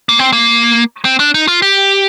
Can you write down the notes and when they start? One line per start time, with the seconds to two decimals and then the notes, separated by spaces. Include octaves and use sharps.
0.09 A#3
0.19 C4
0.33 A#3
1.05 C4
1.20 D4
1.34 D#4
1.48 F4
1.62 G4